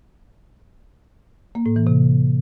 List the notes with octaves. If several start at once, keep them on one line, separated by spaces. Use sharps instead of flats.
A#3
A2
E3
C3